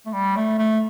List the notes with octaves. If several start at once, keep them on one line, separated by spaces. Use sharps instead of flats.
A3
G3
A3
A3